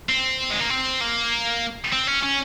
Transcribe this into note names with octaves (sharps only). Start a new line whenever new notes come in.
C4
G#3
A#3
C4
A#3
C4
C#4
C#4